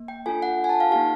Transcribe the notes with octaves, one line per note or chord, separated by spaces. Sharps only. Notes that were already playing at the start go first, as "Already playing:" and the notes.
Already playing: A#3
G5
D4 F4 A4 G#5
F#5
G#5
A5
F5
A#3 D#4 G4 F5